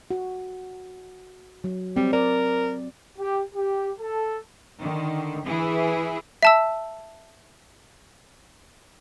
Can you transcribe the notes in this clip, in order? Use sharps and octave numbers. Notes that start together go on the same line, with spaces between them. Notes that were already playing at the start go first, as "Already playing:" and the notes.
F#4
F#3
G3 C4
A#4 D5
G4
G4
A4
D3 D#3
E3 E4 G#4
E5 A5 E6